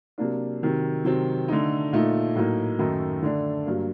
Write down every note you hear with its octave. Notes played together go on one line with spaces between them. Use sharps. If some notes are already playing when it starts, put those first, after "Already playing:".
C3 F#3 A#3 D4
C3 D#3 F#3
C3 D#3 F#3 C4
D3 A3 D#4
A#2 A3 D#4
A2 F#3 A#3 D#4
F#2 D#3 A3 D#4
D3 A3 D4
G2 F#3 A#3